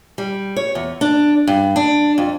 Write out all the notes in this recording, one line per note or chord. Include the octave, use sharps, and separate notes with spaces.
G3
C#5
E2
D4
G2
D4
F2